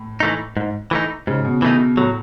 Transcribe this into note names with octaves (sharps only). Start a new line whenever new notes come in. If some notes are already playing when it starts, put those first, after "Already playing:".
Already playing: A2
E3 A3 D#4
G#2
E3 A3 D#4
G#2 C#3
B2
B2 E3 A3 D#4
A2 F#3 A3